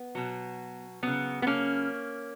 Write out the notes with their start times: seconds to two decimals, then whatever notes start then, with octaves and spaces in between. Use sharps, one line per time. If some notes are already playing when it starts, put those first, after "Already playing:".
Already playing: B3
0.15 B2 F#3
1.03 C#3 F#3 B3
1.42 B3
1.47 A#3 C#4